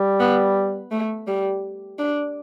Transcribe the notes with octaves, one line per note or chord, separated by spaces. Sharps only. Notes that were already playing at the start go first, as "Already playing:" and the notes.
Already playing: G3
B3
A3
G3
D4